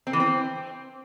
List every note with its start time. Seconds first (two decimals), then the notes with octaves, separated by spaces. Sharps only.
0.07 C4
0.13 E3
0.20 C4